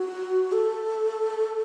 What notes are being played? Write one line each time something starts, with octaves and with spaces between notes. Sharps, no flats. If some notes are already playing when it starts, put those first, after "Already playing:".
Already playing: F#4
A4